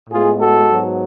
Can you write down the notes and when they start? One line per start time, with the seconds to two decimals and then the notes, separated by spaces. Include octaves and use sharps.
0.10 A2 G#3 B3 F4 G#4
0.40 F#4 A4
0.68 G#2 F#3 B3